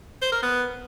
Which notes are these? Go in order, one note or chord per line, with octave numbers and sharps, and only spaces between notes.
C5
A#4
B3